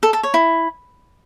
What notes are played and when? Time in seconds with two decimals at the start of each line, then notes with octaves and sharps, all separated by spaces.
0.03 A4
0.13 A4
0.23 C#5
0.34 E4